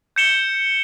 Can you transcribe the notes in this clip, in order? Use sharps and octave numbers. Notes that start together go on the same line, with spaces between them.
G6 C#7 E7 G7